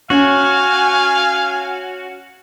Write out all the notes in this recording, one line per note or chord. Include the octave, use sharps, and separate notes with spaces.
C#4 F#4 F5 G#5